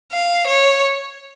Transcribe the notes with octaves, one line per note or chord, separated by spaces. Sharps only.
F5
C#5